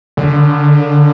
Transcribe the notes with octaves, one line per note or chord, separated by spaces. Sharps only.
D3